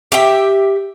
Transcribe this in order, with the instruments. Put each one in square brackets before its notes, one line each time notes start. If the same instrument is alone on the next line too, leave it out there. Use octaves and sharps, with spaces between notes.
[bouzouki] G4 E5 G5